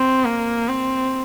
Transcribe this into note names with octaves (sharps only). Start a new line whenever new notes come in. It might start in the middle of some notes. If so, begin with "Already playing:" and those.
Already playing: C4
A#3
C4